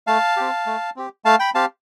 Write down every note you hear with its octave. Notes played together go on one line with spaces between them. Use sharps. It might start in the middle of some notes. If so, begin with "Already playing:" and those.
A3 F5 A5
C4 G4
A3
C4 G4
A3 F5 A5
G5 B5
C4 G4 F5 A5